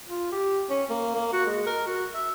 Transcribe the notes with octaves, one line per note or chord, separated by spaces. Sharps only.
F4
G4
C#4
A#3
A#3
F#4
G#3
A#4
F#4
E5